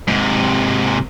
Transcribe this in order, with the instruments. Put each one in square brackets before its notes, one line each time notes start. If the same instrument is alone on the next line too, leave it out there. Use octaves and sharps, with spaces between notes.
[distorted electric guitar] G#2 C3